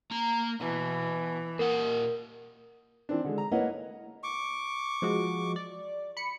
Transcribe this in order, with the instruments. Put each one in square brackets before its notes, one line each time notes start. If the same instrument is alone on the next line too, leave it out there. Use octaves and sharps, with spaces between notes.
[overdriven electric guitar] A#3 A#5
[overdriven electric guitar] B2 [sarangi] E3
[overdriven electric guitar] A#2 F#5 [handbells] A#4
[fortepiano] E3 C4 D4
D3 G#3
A#5
A#3 E4 B4 C#5 D#5 F#5
[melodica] C#6 D6
[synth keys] F3 G#3 F#4
D5
B5 C#7